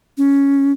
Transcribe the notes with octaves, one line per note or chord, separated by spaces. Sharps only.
C#4